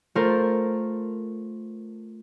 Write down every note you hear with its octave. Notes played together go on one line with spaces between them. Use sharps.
A3 F4 A#4 C5 A5